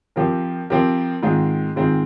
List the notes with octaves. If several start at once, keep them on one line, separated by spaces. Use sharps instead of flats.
F3 C4 G4 A#4
F3 C4 G4 A#4
G#2 D#3 G#3 C4 F4
G#2 D#3 G#3 C4 F4